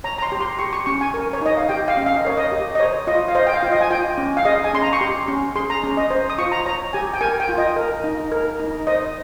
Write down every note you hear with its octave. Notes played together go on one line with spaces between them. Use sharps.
C#5 A#5
A#5
C6
G4
C6
G4 C#6
C#6
C#4 C#6
G#5
A#4
C#5
D#4 D#5
F5
G4 G5
F5
C#4
F5
D#5
A#4 C#5
D#5
G4
D#5
C5 C#5
F4 D#5
F5
C5 D#5
G5
F5
F4
D#5
G#5
F4 G5
C#4
F5
G#4 D#5
G#5
C#4 C6
A#5
C#6
G4 C6
C#4
G#4 C6
A#5
C#4
D#5
C5
D#6
F4 C#6
A#5
C#5 A#5
G4 G#5
G5
A#4 G#5
G5
F4
D#5
A#4
D#4
A#4
D#4
C5 D#5